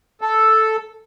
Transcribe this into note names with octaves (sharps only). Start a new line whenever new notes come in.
A4